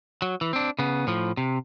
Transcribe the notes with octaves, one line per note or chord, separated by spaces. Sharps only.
F#3
E3
C4 D4
C#3 B3
A2 F3
C3